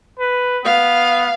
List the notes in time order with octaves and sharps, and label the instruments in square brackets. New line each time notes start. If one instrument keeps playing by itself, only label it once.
[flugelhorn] B4
[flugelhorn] B3 [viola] F5